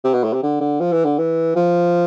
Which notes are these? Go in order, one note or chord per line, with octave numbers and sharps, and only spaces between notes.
C3
B2
A2
C3
D3
D3
F3
E3
D3
E3
F3